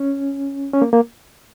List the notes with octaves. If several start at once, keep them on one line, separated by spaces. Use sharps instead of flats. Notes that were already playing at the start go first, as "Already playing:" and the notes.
Already playing: C#4
C#4
A#3
A#3